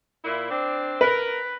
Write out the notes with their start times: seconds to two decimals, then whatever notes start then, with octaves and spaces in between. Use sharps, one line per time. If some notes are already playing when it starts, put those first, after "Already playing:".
0.23 A#2 E4
0.50 C4 D4
1.01 A#4 B4